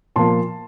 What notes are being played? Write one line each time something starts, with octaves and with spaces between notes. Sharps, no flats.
A#2 F3 A#3 A5 C6